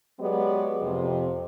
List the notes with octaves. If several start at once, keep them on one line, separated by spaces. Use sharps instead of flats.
F#3 G#3 B3 G4 G#4 D5
F2 C3